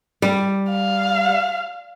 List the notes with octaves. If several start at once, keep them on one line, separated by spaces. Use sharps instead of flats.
G3
F5